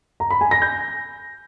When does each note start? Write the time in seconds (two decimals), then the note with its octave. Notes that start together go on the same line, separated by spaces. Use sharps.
0.20 A#5
0.31 B5
0.41 G#5
0.51 A#6
0.62 G6